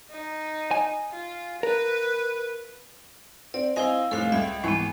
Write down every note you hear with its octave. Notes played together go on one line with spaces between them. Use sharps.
D#4
G#5
F4
A#4 B4
C4 D5
C4 E4 C5 D#5 F5 G#5
F1 A2 A4 F5
C#2 E5 G#6
G#1 E3 G#3 B3 C#6